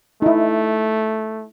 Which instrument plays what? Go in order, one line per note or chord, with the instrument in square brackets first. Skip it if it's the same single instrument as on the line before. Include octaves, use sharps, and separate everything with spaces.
[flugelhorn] A3 [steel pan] D#4 E4